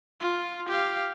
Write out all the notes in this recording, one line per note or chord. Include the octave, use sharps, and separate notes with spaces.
F4
G4 F5